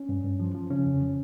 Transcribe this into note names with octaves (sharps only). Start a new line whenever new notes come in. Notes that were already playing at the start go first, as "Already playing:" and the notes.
Already playing: C#4
G2
G2
F3
F3
C#3 C#4
F2
F3